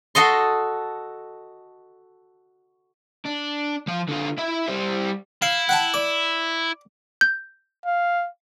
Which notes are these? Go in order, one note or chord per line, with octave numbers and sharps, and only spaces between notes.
F#4 A4 D#5 C6
D4
F3 F5
D3 F4
E4 E5
G3 C5
E4 F5
F#5 G5 A5
D5
G6
F5